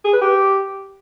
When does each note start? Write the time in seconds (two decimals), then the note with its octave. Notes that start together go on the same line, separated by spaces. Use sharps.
0.05 G#4
0.13 B4
0.21 G4